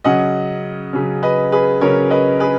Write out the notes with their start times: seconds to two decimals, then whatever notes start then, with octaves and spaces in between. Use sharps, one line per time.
0.04 C#3 F#3 C#4 D#5 F#5
0.93 C#3 F#3 C#4
1.23 B4 D#5
1.52 G#4 B4
1.81 C#3 F#3 C#4 A#4 C#5
2.10 B4 D#5
2.40 G#4 B4